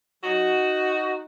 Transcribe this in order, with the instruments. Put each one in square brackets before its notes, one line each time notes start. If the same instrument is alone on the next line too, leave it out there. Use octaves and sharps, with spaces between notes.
[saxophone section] F#3 D#4 F#4